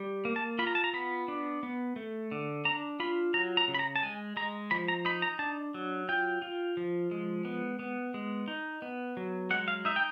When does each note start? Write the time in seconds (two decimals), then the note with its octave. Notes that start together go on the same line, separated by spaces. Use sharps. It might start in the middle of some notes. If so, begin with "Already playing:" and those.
Already playing: G3
0.25 A#3
0.36 A5
0.59 F4 B5
0.67 A#5
0.75 A5
0.84 A#5
0.93 B3 B5
1.28 D4
1.63 B3
1.96 A3
2.31 D3
2.65 D4 A#5
3.00 F4 B5
3.34 F#3 A#5
3.57 A#5
3.68 C#3
3.74 B5
3.79 A#5
3.96 A5
4.03 G#3 G#5
4.37 G#3 A#5
4.71 F3 B5
4.88 A#5
5.05 D#4 B5
5.22 A#5
5.39 D4 A5
5.74 F#3
6.09 F4 G5
6.42 F4
6.77 F3
7.11 G#3
7.45 B3
7.79 B3
8.14 G#3
8.48 D#4
8.82 B3
9.17 F#3
9.50 G#3 F#5
9.68 F5
9.85 D#4 E5
9.96 G5